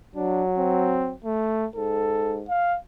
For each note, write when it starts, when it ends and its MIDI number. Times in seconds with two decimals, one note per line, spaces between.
0.15 1.16 54
0.15 0.43 62
0.57 1.13 60
1.24 1.67 57
1.76 2.46 44
1.76 2.38 69
2.49 2.77 77